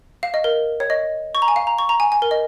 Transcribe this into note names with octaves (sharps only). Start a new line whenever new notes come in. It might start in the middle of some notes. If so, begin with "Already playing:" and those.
F5
D#5
A#4
C#5
D#5
C#6
A#5
G#5
F5
A#5
C#6
A#5
G#5
G#5
A#4
D#5